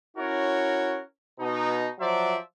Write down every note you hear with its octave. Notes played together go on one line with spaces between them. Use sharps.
C#4 E4 F#4 A#4 C#5
B2 D#4
F3 F#3 C5 D5 E5